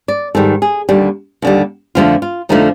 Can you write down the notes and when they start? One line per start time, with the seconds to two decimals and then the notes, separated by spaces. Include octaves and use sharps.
0.08 D5
0.35 G#2 D#3 G3 A4
0.62 G#4
0.89 D#2 D3 G3
1.42 D#2 D3 G3
1.95 F2 D3 F3 A3 F4
2.22 F4
2.49 F2 D3 F3 A3 D#4